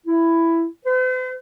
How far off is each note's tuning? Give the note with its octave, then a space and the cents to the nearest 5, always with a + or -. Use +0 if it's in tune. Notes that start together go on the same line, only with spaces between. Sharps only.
E4 +10
C5 -45